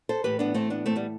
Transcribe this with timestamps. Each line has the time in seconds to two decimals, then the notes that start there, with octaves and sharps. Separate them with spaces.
0.09 A4 C5
0.24 A2 E3 G4 B4
0.39 B3 D4
0.54 A3 C4
0.70 B3 D4
0.86 A3 C4
0.96 G3 B3